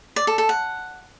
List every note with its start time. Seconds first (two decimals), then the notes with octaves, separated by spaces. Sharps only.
0.16 D5
0.27 A4
0.38 A4
0.49 F#5